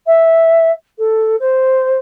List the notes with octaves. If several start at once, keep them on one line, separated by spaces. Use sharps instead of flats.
E5
A4
C5